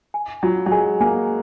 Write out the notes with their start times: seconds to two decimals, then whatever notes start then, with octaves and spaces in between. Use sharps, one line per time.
0.14 G#5
0.43 F#3 F4
0.66 F#3
0.72 G#3 G#5
1.00 A#3 G#5